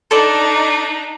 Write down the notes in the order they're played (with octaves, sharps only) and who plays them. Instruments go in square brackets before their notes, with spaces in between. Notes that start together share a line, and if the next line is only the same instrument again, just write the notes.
[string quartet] D4 D#4 [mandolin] A4 D5